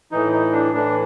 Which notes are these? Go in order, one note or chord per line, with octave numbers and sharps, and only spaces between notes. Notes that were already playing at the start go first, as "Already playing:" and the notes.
A2 E3 D#4
D#4
D4
A2 E3 D4